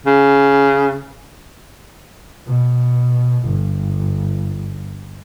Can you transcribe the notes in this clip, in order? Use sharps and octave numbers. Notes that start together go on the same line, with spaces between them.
C#3
B2
G1